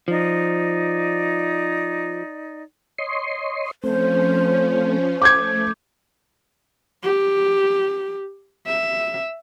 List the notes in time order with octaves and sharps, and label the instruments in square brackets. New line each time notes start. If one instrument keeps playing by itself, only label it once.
[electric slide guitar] F3 [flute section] D#4 D5
[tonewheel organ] C#5 D#5 C6
[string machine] F3 C#4 [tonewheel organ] A3 C4 [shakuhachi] C5
[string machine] A3 [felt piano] D6 G6 G#6
[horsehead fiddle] G4
E5